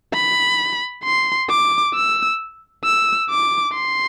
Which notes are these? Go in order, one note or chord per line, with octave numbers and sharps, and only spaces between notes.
B5
C6
D6
E6
E6
D6
C6